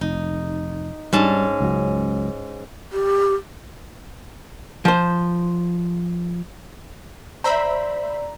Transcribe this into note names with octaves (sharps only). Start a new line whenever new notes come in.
F1 D#4
G#2 G3 C#4 D4 A5
C#2 F#3
G4
F3 C5
C5 D5 E5 A#5 B5